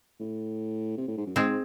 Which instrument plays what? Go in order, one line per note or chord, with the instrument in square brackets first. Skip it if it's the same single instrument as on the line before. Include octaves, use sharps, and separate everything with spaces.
[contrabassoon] A2
C3
A2
G#2
F#2
[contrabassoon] G#2 [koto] G#3 C4